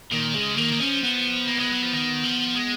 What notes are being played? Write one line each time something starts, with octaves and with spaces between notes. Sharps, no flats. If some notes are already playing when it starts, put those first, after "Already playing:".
A#2 D#3
C#3 G#3
D#3 A#3
D#3
F3 C#4
B3
A#3
G#3
F#3
F3
D#3
F3
G#3